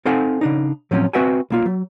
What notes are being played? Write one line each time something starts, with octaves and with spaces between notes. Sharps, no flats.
C4 D#4 A4 F5 F#5 G#5
C#3 D4 D#4
A2 F3 F#3 C4 C#4
C4 F#4 B4 E5 F#5 G#5
B1 A#3 F4
F#3